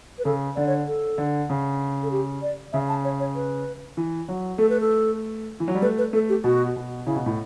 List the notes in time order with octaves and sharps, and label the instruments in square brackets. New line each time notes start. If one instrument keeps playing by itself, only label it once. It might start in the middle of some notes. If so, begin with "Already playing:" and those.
[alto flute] B4
[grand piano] C#3 [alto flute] A4
[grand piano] D3 [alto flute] D5
[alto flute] C#5
A4
[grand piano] D3
C#3
[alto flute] A4
G4
D5
[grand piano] C#3 [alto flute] E5
[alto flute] A5
C#5
C#5
B4
[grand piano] E3
F#3
[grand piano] A3 [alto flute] A4
[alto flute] B4
A4
[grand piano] E3
F#3
G3
[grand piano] A3 [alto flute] B4
[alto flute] B4
[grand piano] A3 [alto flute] A4
[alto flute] G4
[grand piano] B2 [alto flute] F#4
[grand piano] B2
[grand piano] C#3 [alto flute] E4
[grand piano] B2
A2